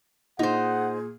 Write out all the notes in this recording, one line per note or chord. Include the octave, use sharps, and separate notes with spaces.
A#2 D#4 G#4 C5 F#5